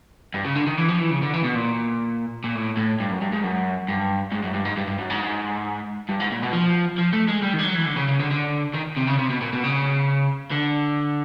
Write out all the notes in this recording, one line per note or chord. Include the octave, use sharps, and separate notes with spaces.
G2
C#3
D3
D#3
E3
F3
E3
C#3
D3
E3
B2
A#2
A#2
A2
A2
G2
F#2
G2
G#2
F#2
G2
G#2
F#2
G2
G#2
G2
G2
F#2
G#2
G2
G#2
A#2
B2
F3
F3
A3
G#3
G3
D#3
G3
F#3
E3
D3
C#3
C#3
D3
D3
D#3
C3
C#3
C3
B2
A#2
B2
C#3
D3